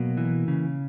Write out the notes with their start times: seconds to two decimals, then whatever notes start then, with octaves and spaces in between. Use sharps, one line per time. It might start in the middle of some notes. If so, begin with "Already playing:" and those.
Already playing: B2 F#3 A#3
0.17 E3
0.48 C#3